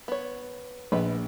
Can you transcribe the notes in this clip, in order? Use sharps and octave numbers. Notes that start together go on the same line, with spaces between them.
B3 C#5
A#1 B3 B4